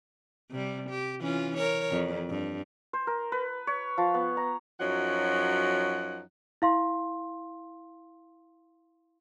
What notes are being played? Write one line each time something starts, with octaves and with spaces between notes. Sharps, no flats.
C3 G3
G4
E3 C#4 F4
A#4 C#5
F2
G2
C5
A#4
B4
C#5
F3
B3
A#5
F#2 F3 F#3 D#4 F#5
E4 F5 C6